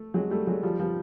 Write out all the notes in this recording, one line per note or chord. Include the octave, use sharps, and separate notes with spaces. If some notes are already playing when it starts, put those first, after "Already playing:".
Already playing: A3
F#3 G#3
G3 A3
F#3 G#3
F3 G3
F3 G3